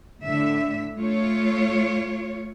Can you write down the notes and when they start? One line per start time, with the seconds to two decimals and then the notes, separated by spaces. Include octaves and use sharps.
0.24 A2 D3 E5
0.99 A3 F4 C#5